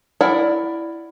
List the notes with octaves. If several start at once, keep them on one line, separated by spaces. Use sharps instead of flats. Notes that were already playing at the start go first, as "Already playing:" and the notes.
E4 A#4 D5 F#5